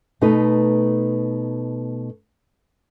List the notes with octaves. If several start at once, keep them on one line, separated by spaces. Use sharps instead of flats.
B2 A3 D#4 B4